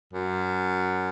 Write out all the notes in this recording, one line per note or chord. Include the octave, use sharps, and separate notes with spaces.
F#2